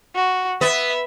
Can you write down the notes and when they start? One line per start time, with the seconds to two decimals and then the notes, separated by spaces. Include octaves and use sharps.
0.15 F#4
0.61 B3 E5